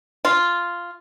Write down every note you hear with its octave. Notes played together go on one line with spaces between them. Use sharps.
F4